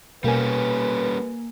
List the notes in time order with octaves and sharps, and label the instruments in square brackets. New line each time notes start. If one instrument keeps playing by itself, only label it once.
[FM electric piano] B2 [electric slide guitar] G3 C#4 [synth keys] A#3 A#4 G#5 [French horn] B4